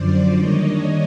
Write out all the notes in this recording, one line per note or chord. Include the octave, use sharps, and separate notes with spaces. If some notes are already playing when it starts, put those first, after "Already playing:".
Already playing: F#2 D3 F3 C5 D5
D#3 G3 A#3 D4 C#5 D#5